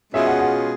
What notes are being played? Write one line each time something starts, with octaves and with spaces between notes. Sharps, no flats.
B2 G#3 C#4 F4 G#4 E5
F#5
F#5